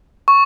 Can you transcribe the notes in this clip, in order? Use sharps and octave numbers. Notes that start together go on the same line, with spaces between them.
C#6